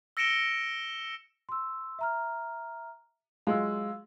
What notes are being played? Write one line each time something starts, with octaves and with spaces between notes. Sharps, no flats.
E6 A#6 C#7 D7 E7 G7
C6 E6
E5 A#5 F6
F#3 G#3 F4 F5 E6